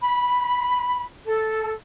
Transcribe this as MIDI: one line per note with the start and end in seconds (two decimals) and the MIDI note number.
0.01 1.02 83
1.23 1.70 69